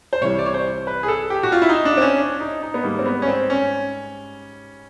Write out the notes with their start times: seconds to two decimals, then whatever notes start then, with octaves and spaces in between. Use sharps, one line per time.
0.13 C5
0.21 C2 C3 E3 G3 C#5
0.39 D5
0.46 C#5
0.54 C5
0.87 B4
1.03 G#4
1.08 A4
1.30 G4
1.43 F#4
1.52 F4
1.62 E4
1.69 D#4
1.85 D4
1.97 C4
2.02 C#4
2.18 D4
2.40 D#4
2.63 D#4
2.74 B3
2.84 G#2 D#3 G3 A#3
2.99 C4
3.06 B3
3.22 C#4
3.28 C4
3.50 C#4